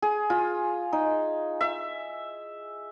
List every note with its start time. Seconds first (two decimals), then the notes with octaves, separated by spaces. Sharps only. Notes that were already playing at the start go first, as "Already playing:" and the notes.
0.02 G#4
0.30 F4
0.93 D#4
1.61 E5